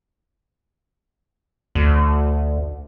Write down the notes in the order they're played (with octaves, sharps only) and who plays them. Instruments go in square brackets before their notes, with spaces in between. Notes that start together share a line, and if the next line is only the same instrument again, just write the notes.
[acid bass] D2